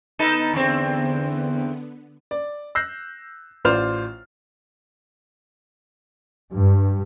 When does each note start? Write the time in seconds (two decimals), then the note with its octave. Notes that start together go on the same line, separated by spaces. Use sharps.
0.19 D3 B3 D#4 A4 B4
0.54 E2 C4
2.31 D5
2.75 E6 F#6 G6 A#6 C7
3.65 A1 F4 C5 D5 F6 F7
6.53 G2